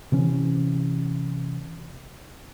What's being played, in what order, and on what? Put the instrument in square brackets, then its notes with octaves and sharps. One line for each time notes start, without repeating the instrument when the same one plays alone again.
[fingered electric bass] C3 E3 C#4